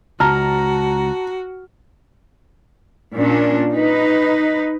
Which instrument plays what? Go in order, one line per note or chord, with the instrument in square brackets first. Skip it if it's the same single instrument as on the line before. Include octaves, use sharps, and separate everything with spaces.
[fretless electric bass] C#2 [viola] F#4 [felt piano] A5 A#5 F6
[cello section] A#2 C#4 D4
D#4 B4